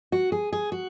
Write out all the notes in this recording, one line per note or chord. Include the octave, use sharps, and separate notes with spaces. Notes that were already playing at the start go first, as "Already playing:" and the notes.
F#4
G#4
G#4
F#4